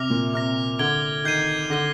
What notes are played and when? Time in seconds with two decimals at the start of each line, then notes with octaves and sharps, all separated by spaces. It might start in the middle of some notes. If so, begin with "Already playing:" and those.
Already playing: C3 D6 F6 A#6 F7
0.10 A#2
0.34 C3 D6 F6 A#6
0.79 D3 G#6 D7 G7
1.24 D#3 G6 C7 D#7
1.70 D3 G6 A#6 D#7 G7